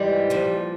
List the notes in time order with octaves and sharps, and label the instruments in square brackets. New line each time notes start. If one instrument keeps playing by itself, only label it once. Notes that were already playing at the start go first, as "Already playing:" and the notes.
Already playing: [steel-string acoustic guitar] G#2 E3 G3
A#2 F3